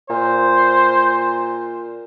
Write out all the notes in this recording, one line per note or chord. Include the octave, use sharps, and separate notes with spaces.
A#2 C5